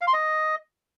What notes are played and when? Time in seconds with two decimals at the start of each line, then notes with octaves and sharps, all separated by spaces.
0.01 F5
0.07 C6
0.13 D#5